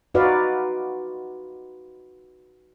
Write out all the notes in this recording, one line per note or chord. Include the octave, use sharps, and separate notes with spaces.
D#4 F4 F#4 B4 D5 F5